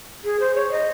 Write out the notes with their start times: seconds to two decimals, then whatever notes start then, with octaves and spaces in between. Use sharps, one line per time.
0.24 G#4
0.40 C5
0.55 C#5
0.71 D#5